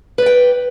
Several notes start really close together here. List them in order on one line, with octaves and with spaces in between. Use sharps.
B4 D5 G5